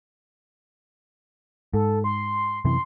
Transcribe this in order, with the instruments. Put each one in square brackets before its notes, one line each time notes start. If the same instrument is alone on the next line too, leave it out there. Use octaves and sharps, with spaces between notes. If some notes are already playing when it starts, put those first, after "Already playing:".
[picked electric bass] G#2 [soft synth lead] A4
[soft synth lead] C6
[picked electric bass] F#2 C3 E3 [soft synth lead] C6